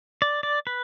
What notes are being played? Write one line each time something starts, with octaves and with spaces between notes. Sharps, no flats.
D5
D5
B4